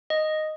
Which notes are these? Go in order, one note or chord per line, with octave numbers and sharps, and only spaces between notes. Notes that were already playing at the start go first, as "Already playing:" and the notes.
D#5